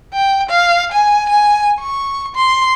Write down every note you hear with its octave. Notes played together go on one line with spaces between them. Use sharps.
G5
F5
G#5
G#5
C#6
C6